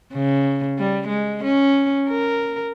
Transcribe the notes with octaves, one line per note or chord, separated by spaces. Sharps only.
C#3
G3
G#3
C#4
A#4